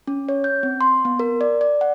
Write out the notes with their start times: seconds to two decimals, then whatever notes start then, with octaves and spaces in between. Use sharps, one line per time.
0.07 C#4
0.29 C#5
0.44 G6
0.63 C4
0.81 C6
1.05 B3
1.19 A#4
1.41 D5
1.61 D5
1.81 F#5